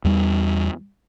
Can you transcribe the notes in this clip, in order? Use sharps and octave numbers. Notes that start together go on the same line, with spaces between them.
E2 G3